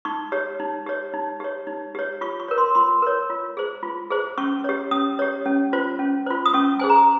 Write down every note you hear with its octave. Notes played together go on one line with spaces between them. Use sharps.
D#4 C#6
G4 C#5
D#4
G4 C#5
D#4
G4 C#5
D#4
G4 C#5
F4 C#6
C#6
A#4 C#5
C6
F4 C6
A#4 C#5
F4
G#4 C5
F4
G#4 C5
C#4 C#6
G4 C#5
C#4 D#6
G4 C#5
C#4
F4 C5
C#4
F4 C5
D#6
C#4 C#6
G#4 C5 G#5
A#5